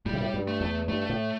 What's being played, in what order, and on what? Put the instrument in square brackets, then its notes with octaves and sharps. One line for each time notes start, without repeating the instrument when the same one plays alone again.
[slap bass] A2 [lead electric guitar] G3
[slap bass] C3
A2
G2
[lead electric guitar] A3
[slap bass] E2
[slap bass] G2 [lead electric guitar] A3
[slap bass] A2